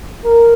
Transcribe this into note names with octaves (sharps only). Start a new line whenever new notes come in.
A#4